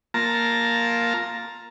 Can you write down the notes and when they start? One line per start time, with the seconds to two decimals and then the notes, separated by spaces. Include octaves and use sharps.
0.14 A#3 F4 A5 A#5